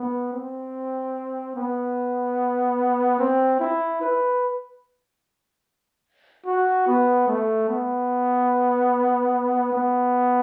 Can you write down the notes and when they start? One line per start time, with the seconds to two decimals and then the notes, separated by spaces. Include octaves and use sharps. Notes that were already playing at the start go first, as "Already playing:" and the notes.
Already playing: B3
0.33 C4
1.56 B3
3.19 C4
3.60 E4
4.01 B4
6.46 F#4
6.87 B3
7.27 A3
7.69 B3
9.73 B3